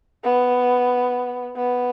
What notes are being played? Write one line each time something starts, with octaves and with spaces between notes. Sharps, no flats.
B3
B3